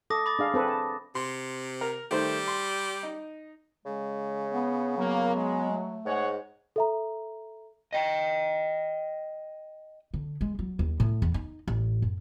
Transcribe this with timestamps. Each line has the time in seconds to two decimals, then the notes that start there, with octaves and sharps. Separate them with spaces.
0.10 A4 D6 D#6 A#6
0.26 B5 D6 A6
0.39 D4 G#4 F5
0.54 C4 A4 B4
0.68 A5
1.15 C3 C6
1.81 A#4
2.11 D#3 G3 A3 C5
2.48 C6
3.03 D#4
3.86 C#3 G#3
4.52 B3
4.97 F#3 A#3 B3
5.36 G#3
5.71 A3
6.05 G#2 G#4 C#5 F#5
6.76 A4 E5 A#5
7.93 D#5 G5
10.14 D3
10.41 G#3
10.59 F#3
10.79 D#2
11.00 A2
11.22 E2
11.34 D#4
11.68 A1
12.02 F#2